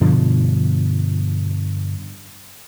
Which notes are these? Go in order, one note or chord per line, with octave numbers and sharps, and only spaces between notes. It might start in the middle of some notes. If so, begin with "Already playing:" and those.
G2 B2 D3 F3